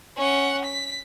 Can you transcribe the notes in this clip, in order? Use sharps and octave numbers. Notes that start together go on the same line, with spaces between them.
C#4 F#5
B6